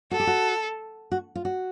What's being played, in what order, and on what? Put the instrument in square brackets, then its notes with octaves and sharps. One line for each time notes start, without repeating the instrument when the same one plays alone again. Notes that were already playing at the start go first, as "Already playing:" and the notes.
[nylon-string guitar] F#4 [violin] A4
[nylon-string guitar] G4
F#4
F#4
F4
F#4